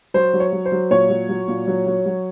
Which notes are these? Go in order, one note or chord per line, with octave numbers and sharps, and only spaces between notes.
F#3 C5
F#3
C#5
F#3
C5
F#3
A#2 C#5
F#3
F#3
A#2
F#3
F#3
F#3